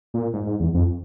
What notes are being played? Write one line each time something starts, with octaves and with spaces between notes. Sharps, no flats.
A#2
G#2
G#2
E2
F2